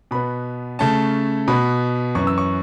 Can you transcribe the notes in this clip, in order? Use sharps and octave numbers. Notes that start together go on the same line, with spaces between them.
B2 B3 B5
C#3 A3 C#4 A5
B2 B3 B5
F#2 E3 C#4 C#6
E6
C#6